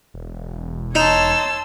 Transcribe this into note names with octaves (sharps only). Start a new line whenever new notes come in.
E1
D#4 C#5 A5 C6 E6